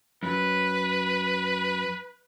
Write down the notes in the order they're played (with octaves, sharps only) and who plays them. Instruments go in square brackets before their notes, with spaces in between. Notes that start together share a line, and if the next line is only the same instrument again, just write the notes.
[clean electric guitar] F#2 [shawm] B4